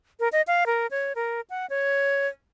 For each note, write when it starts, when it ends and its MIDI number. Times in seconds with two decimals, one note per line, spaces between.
0.20 0.28 70
0.33 0.42 75
0.47 0.64 77
0.66 0.87 70
0.91 1.13 73
1.16 1.41 70
1.50 1.66 78
1.70 2.27 73